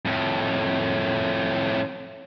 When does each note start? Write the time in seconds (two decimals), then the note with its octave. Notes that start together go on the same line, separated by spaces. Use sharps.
0.06 F2 A2